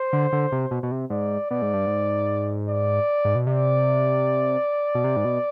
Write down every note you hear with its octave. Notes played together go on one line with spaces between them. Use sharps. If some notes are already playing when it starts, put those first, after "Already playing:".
Already playing: C5
D3
D3
C3
B2
B2
C3
G#2 D5
B2 D5
G#2
G2
G#2
D5
G#2
B2
C3 D5
B2
C3
G#2
B2